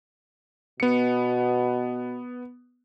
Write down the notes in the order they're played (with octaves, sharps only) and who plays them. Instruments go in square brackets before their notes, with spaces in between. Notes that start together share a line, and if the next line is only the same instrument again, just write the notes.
[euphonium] B2 [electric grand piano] B3 C#7